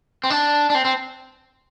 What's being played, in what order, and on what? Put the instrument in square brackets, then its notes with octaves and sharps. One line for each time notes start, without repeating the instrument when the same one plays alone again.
[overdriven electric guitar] C4
D4
D4
C4
C4